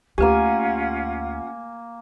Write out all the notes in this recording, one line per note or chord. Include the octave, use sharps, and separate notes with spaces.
D2 A#3 C#4 F4 G4 B4 F#5 G#5